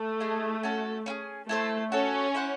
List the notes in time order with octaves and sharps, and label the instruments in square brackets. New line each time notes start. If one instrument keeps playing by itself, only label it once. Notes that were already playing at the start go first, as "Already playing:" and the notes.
Already playing: [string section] A3
[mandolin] E4 G#4 D#5
C#4 F#4 A4
C#4 E4 G#4
[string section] A3 [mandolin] E4 A4 C5
[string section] C#4 [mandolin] F#4 A4 C#5
[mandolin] E4 C5 F#5